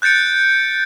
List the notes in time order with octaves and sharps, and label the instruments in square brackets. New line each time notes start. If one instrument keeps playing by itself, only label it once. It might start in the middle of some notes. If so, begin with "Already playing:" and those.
[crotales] F#6 G6 A6 C#7 D7